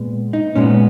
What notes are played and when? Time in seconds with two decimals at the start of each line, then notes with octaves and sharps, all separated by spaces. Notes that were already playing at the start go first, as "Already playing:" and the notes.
Already playing: A#2 G#3 B3
0.33 D#4
0.55 A#2 G#3 B3 C#4